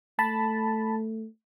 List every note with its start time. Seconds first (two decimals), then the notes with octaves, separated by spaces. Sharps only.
0.19 A3 A5 B5